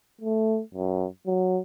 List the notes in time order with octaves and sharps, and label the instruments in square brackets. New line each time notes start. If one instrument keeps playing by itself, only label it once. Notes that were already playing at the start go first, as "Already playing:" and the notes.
[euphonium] A3
F#2
F#3